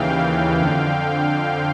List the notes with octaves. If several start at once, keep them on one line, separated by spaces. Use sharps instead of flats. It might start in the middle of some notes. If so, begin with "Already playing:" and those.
Already playing: D#2 C#3 E3 F5 G5
F2 D3